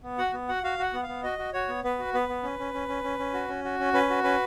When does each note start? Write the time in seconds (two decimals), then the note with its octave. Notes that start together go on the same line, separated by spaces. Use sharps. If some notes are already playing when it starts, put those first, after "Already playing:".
0.03 B3
0.18 F#4 F#5
0.33 B3
0.49 F#4 F#5
0.63 F#4 F5
0.79 F#4 F#5
0.93 B3
1.03 F5
1.08 B3
1.23 F#4 D#5
1.39 F#4
1.53 F#4 C#5
1.69 B3
1.84 B3 B4
1.99 F#4
2.14 B3 B4
2.29 B3
2.43 C#4
2.59 C#4
2.74 C#4
2.88 C#4
3.04 C#4
3.19 C#4
3.34 F#4
3.48 C#4
3.64 F#4
3.79 C#4
3.93 C#4 B4
4.10 F#4
4.23 C#4 B4